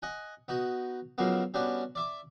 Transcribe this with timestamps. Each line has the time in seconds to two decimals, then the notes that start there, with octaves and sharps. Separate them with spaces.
0.02 D#5 F#5 G#5
0.48 B3 D#4 F#4
1.18 C#3 F3 F#3 G#3 A#3 B3
1.54 G3 B3 C#4 D4 F#4
1.95 D5 E5 D6